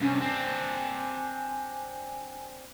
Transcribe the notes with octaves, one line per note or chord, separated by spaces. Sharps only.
G2 C3 C#4
C4 D4 G#5